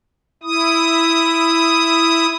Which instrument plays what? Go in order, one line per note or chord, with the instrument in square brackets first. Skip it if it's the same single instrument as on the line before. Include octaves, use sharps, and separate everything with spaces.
[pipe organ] E4 D#6